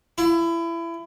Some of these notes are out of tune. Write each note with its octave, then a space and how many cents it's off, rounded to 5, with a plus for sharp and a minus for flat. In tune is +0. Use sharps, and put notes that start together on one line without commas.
E4 +25